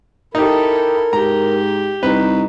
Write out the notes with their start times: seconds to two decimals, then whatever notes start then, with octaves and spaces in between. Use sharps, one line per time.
0.35 D#4 E4 G4 A4 A#4
1.13 G#2 G4 A#5
2.03 C2 D#4 B4